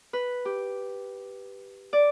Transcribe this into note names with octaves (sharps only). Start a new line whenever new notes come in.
B4
G4
D5